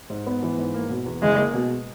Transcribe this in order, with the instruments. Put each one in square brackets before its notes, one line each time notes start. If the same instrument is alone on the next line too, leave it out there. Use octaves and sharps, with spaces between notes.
[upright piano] G#2
B3
E3
G#2
A#3
B2
E2
[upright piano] F#1 [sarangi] G#3
[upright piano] A#3
B2